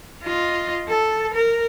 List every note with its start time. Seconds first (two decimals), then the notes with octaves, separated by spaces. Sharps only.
0.24 F4 D#5
0.89 A4
1.34 A#4